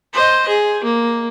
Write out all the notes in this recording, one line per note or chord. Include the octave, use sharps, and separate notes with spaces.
C5 D#5
G#4
A#3